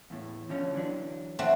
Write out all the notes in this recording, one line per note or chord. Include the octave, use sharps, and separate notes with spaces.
E2 A2
D3 F3 C#4
E3 F#3 D4
A3 C4 F#4